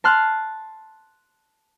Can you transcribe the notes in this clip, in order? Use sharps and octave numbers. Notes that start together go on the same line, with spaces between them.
A5 C6 F6 F#6